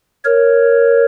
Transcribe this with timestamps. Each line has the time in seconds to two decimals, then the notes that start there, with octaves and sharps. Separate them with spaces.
0.25 A#4 C#5